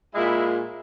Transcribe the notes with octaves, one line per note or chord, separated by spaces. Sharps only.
A#2 G#3 E4